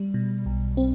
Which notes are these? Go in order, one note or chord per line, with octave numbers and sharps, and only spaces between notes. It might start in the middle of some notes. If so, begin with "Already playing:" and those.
Already playing: G3
B2
B1
C4